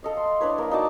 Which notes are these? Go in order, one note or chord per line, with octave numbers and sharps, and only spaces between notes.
A4 D#5 F5
C6
D4 E4 B4 C#5
A#3 D#5
D#4 F#4 D5 A5